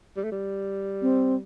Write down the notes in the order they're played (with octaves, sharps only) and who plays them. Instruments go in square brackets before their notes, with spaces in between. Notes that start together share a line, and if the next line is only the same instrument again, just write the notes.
[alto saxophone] G3
A3
G3
[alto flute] C4